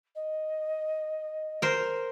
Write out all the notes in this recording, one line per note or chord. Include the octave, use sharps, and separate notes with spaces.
D#5
A#4 C5